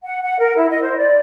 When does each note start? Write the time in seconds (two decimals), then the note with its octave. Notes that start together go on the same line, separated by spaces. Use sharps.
0.03 F#5
0.24 F#5
0.39 A#4
0.56 E4
0.70 D#5
0.82 C5
0.97 D5